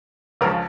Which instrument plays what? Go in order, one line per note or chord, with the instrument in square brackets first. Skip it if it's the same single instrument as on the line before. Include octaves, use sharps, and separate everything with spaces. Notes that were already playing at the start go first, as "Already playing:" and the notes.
[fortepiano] C#2 C#3 F3 A#4